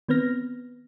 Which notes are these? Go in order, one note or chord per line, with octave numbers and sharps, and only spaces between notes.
D#3 B3 C4 B4 F6 A#6